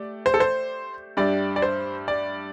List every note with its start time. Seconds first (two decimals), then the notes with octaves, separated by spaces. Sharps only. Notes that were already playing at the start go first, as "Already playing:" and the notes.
Already playing: A3 G4 D5
0.26 C5
0.34 A4
0.40 C5
1.17 G2 G3 D4 G4 D5 E5
1.56 D5
1.62 C5
2.08 D5